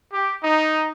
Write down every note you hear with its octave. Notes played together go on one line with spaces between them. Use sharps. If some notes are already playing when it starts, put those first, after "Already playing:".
G4
D#4